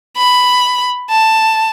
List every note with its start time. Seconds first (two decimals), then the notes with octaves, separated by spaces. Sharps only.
0.17 B5
1.10 A5